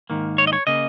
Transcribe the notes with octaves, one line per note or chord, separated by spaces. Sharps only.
G#2 D#3 A#3
C#5
D#5
C#5
C#3 A#3 D#5